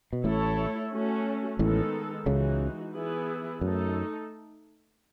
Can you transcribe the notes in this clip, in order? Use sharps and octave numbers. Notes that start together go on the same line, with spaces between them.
B2
A1 A2 A3 E4 A4 C#5
A3 C#4 F#4
A1 A2 D#3 G#3 B3 D#4 A4
C#2 C#3 E3 G#3 D#4 F#4
E3 B3 E4 G#4 B4
F#2 A3 D#4 A4